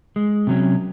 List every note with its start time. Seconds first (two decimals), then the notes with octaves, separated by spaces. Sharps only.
0.16 G#3
0.47 C3 F#3 C#4